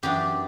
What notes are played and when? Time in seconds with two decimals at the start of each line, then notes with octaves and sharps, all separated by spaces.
0.03 F#2 E3 B3 D4 G4